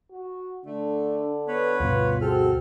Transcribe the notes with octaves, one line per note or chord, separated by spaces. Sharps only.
F#4
D3 A3 D4
B3 B4 C#5 B5
D2 G2 B2 F4
C4 F#4 G#4 A4 F6